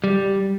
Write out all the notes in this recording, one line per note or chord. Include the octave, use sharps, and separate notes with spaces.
G3